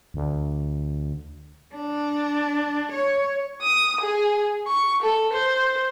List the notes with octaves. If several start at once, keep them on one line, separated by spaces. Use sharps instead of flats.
D2
D4
C#5
D#6
G#4
C#6
A4
C5